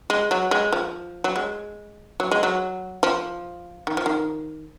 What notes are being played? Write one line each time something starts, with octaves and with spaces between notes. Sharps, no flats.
G#3
F#3
G#3
F3
F#3
G#3
F#3
G#3
F#3
F3
D#3
F3
D#3